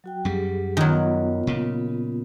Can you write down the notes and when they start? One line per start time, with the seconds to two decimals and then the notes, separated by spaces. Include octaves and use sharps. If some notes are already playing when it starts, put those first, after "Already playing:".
0.04 F#3 F#4 G5
0.25 F#2 F#3 G3 G4 G#4
0.77 D#3 F#3 B3 F4
1.47 A#2 C#3